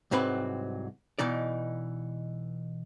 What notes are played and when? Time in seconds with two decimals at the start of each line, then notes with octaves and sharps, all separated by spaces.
0.11 C2 G#2 F#3 C4 B4 B5
1.19 B2 E3 D#4 D5